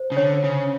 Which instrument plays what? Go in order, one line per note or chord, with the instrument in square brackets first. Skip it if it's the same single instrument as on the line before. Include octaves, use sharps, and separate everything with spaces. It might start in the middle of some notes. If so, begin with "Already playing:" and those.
Already playing: [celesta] C5
[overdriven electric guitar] C#3
[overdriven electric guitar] D3 [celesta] C#5
[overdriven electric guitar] C#3